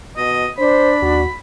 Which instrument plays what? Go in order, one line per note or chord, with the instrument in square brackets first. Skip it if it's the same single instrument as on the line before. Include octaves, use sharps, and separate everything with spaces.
[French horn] B2 [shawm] D#5
[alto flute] D4 [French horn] C5 [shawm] B5
[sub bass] D#2 [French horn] F#4